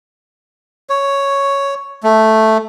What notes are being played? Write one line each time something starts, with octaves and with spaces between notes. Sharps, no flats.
C#5
A3